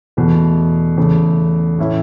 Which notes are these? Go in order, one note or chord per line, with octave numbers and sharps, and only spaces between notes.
E2 B2 A3
E2 C#3 A3
A2 E3 A3 C#4 E4